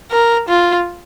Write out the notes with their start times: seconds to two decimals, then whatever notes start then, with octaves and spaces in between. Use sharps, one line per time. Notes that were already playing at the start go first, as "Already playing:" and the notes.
0.11 A#4
0.48 F4